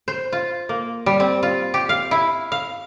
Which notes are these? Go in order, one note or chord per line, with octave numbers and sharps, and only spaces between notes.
C5
F4
A#3
G3
C4
F4
G4
F5
E4
F5